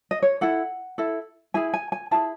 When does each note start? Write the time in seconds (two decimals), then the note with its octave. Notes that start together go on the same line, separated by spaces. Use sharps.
0.11 D#5
0.22 C#5
0.41 E4 A4 F#5
0.98 E4 A4
1.54 E4 G#4 G#5
1.74 G#5
1.92 G#5
2.11 E4 G#4 A5